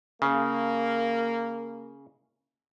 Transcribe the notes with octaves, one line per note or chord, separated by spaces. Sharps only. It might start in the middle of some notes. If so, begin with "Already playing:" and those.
C#3 A#3